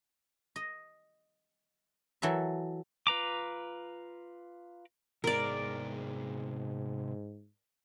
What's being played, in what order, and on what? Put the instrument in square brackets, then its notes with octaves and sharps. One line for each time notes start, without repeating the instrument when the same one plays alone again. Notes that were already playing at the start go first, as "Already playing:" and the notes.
[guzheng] D#5
E3 F#3 A4 E5
[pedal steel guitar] F4 B4 A#5 D6
[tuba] G#2 [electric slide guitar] C3 B3 G#4 [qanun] A#4 D5